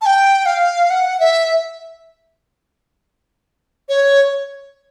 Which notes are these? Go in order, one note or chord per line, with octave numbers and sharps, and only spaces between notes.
A5
G5
F5
F#5
E5
C#5